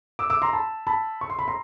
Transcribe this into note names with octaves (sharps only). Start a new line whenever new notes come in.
D6 E6
D6 E6
A#5 C6
A5 B5
A5 B5
C#6
C6
B5
A#5 C6